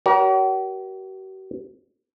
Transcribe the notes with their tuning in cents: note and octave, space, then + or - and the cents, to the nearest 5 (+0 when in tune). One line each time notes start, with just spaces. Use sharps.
F#4 +45 A#4 +30 C#5 +35